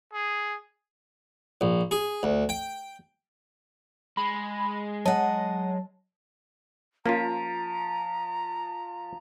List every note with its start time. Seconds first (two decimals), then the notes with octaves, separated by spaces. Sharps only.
0.13 G#4
1.61 A#1
1.91 G#4
2.23 D2
2.49 G5
4.17 G#3 B5
5.06 F#3 D#5 F#5 A5
7.06 F3 A#3 C#4 F4 A#5